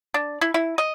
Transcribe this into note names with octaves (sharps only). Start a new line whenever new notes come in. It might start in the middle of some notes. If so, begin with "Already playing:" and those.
D4
E4
E4
D#5